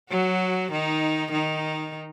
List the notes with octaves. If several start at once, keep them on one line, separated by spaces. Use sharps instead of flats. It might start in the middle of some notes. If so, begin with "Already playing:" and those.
F#3 F#4
D#3 D#4
D#3 D#4